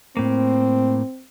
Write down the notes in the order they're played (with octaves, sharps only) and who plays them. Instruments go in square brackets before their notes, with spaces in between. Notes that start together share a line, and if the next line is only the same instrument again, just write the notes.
[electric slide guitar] A2 A#3 [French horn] C4